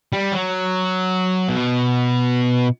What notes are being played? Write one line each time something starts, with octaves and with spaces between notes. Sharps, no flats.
G3
F#3
B2